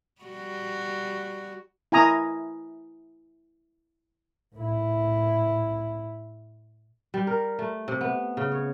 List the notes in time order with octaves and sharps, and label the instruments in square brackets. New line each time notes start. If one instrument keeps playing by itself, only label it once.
[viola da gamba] G3 F#4
[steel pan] E4 G#5 A#5 D#6
[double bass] A2 E4
[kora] G3
A#4
A3
C3
B3
C#3
C#5